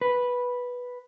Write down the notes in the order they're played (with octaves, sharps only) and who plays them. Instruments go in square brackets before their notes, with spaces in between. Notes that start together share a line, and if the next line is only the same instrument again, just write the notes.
[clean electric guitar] B4